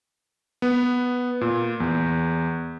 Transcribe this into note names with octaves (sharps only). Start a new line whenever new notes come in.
B3
A#2
E2